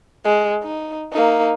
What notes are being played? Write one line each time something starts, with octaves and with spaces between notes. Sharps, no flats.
G#3
D#4
A#3 D#4